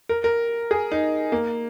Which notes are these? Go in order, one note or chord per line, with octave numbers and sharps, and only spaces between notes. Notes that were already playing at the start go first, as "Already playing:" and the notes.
A#4
A#4
G#4
D#4
A#3